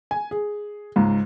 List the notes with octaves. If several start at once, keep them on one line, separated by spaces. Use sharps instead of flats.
G#5
G#4
C#2 G#2